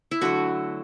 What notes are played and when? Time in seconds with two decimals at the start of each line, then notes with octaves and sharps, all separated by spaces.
0.11 E4
0.21 D3 F#3 A3 F#4